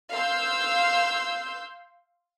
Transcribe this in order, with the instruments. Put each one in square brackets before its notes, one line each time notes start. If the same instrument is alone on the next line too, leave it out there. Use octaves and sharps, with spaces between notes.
[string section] F5 C6 E6 G6